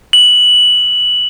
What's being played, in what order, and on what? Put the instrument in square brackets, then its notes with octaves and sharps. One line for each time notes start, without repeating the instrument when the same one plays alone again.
[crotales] F#7